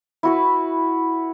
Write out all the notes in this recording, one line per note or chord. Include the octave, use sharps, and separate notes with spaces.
E4 F#4 B4